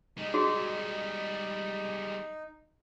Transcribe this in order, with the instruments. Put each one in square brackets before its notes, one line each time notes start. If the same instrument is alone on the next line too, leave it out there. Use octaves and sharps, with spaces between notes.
[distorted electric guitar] G3 G#3 [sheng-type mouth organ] D#4
[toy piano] F#4 G#4